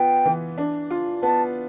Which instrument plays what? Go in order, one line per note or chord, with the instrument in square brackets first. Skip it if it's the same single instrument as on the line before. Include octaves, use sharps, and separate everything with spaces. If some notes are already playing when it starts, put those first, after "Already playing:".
Already playing: [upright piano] B3 F4 [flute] G5
[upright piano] E3
D4
F4
[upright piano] B3 [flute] A5